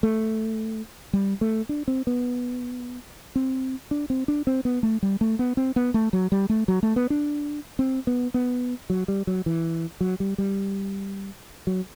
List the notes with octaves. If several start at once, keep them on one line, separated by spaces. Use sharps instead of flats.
A3
G3
A3
D4
C4
B3
C4
D4
C4
D4
C4
B3
A3
G3
A3
B3
C4
B3
A3
F#3
G3
A3
F#3
A3
B3
D4
C4
B3
B3
F#3
G3
F#3
E3
F#3
G3
G3
F#3